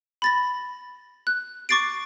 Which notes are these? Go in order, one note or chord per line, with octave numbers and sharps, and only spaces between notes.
B5 A6 A#6
F#6
C#6 D6 A6 C7 D7